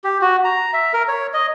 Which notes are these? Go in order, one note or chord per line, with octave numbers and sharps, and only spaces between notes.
G4
F#4
A#5
E5
A#4
C#5
D#5